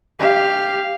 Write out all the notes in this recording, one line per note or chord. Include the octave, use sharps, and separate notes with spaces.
G4 F5